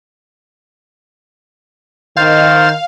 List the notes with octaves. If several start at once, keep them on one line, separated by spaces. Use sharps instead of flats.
D#3 C5 F5 F6 A6